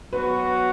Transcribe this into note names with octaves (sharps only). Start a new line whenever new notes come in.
F#3 B3 F#4 B4